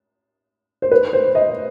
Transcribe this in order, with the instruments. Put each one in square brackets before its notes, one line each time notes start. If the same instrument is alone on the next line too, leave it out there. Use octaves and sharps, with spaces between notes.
[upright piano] C5
B4
C5
D#5